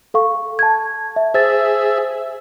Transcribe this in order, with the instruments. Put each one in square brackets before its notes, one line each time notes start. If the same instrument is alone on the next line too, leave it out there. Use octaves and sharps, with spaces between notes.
[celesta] A4 F5 C#6
A5 G#6
E5
[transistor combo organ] G#4 E5 [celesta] C5 A6